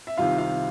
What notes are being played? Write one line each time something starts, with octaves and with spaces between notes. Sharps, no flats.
E5
C2 C3 D#3 F4 F5
F4 F5